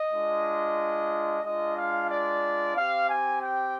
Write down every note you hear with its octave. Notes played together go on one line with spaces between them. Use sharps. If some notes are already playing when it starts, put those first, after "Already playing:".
Already playing: D#5
G#3 D4 F4
G#3 D4 F4 D#5
F5
D5
C4 G4 F5
G#5
G5